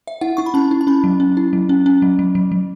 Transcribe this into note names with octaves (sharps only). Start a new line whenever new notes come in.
E5
E4 F#5
E4 C#6
B5
C#4 A5
E4
A5
C#4 B5
F#3
C#4
E4
F#3
C#4
C#4
F#3
F#3
F#3
F#3